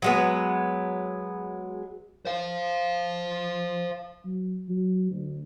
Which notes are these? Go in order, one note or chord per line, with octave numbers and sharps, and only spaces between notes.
F#3 G#3 B3
C5 F5
F#3
F#3
D2